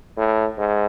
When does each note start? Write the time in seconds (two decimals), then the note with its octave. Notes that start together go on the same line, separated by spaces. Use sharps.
0.17 A2
0.58 G#2